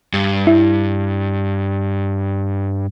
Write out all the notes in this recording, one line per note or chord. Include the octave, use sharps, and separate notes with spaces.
G2
E4